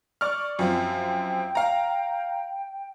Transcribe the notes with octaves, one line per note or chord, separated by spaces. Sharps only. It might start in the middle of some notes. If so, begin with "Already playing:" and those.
D5 C#6 F6
F#2 F3 C4 G5
F5 A#5